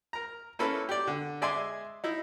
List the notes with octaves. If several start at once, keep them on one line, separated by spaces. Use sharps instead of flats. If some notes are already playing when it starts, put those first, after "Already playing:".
A#4 A#5
A#3 C#4 E4 A4 B4
G4 D5
D3
G#3 D5 E5 G#5 C6
D#4 E4